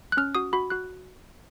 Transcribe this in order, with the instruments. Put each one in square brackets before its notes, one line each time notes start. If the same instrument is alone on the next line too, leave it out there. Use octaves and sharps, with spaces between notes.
[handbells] F#6
C#4 F6
F#4 D#6
F#4 B5
F#4 F#6